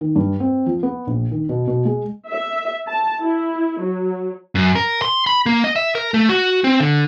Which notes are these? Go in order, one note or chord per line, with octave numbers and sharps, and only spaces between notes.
D#3
G2
C4
F3
B3
A#1
D#3
B2
B2
G#3
E5
A5
E4
F#3
F#2
A#4
C6
B5
A#3
D#5
E5
A#4
A3
F#4
C4
D3